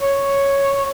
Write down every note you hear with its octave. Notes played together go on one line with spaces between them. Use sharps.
C#5